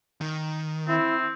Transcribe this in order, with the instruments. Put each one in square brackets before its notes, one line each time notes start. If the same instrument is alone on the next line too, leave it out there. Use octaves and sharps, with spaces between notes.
[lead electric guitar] D#3
[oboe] C4 [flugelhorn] E4